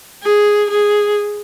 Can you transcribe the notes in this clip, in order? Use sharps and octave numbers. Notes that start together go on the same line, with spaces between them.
G#4
G#4